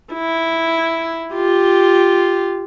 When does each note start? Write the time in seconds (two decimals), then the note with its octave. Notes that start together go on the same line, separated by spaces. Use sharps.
0.13 E4
1.34 F4 G4